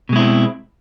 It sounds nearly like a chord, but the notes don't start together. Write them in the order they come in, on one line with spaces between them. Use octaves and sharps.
B2 G#3 E4 C4